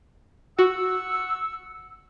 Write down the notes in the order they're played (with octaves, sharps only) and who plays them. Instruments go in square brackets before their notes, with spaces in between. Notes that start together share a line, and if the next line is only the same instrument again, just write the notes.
[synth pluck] F#4 [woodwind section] F#5 C#6 E6